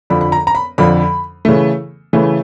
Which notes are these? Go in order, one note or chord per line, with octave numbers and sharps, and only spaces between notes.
F2 D3 F3 B5
B5
A#5
A#5
B5
F2 D3 F3 B5
C#3 E3 A3
C#3 E3 A3